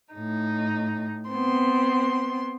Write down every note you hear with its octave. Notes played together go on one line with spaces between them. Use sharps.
A2 D#4
B3 C4 C6